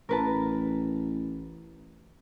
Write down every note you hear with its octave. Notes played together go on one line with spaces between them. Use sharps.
A1 A#4 B4 A5